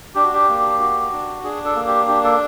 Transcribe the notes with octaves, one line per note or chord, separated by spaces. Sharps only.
D4 G4
F#4
G4
A#3
F#4
D4
D4 G#4
A4
A#3
G4
D4 G4
A4